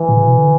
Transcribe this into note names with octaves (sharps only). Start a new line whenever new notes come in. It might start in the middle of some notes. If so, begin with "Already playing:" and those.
Already playing: E3
A2
C#3
B2
D3